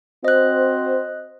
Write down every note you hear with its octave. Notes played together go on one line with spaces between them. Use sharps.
C4 F#4 C5 D#5 F#6